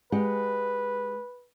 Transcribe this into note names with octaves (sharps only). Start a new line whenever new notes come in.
G#3 G4 B4 F#5